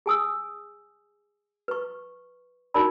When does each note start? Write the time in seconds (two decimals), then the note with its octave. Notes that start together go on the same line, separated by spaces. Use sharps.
0.06 G#4 G#5 D#6 E6
1.68 B4 C#6
2.74 D#4 F#4 A#4 D5 B5